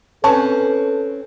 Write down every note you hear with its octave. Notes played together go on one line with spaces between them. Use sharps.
C4 C#4 A4 B4 C#5 A5 C#6